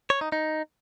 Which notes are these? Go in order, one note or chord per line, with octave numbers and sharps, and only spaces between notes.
C#5
D#4
D#4